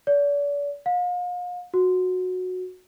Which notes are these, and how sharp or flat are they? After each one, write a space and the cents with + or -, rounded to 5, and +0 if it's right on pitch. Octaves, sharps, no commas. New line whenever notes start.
D5 -40
F5 +40
F#4 -10